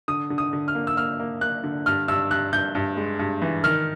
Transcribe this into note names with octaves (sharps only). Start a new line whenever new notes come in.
D3 D#6
D3
D#6
D3
F6
A#3
E6
A#3 F6
A#3
A#3 F#6
D3
G2 F6
G2 E6
G2 F#6
G2 G6
G2
G#3
G2
E3
D#3 F6